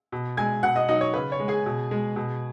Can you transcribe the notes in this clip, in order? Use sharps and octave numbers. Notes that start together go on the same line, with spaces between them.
B2
G#3 G#5 G#6
B2 F#5 F#6
D#5 D#6
F#3 D#4 D#5
C#5
C#3 B4
C#5
G#3
G#4 G#5
B2
G#3
B2